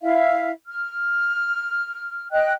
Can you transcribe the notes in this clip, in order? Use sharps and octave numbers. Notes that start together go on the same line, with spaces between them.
E4 E5 F5
F6
D#5 G5 F#6